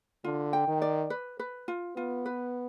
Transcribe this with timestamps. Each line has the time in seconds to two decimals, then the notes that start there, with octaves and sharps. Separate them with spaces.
0.24 D3 F4
0.53 G5
0.68 D#3
0.82 D5
1.10 B4
1.39 B4
1.68 F4
1.97 B3 F4
2.26 B4